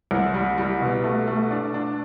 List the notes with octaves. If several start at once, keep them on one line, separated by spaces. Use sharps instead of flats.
C2
G3
G3
B2
A3
A3
D4
D4